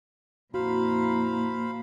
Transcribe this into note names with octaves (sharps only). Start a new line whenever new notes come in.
F2 A#2 E4 F#4 C5 F5 A#5 B5